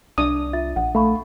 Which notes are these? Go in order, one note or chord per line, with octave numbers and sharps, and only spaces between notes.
C2 D4 D#6
F4 E5 A6
A#1 F#5
A3 F5 B5 C#6